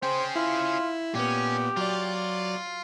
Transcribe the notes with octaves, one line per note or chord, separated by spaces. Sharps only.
C#4 G#4 C5 G5
E4 F4
A#2 B3 C#4 G4
F#3 F4 D5